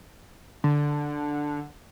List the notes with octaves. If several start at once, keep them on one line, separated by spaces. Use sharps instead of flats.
D3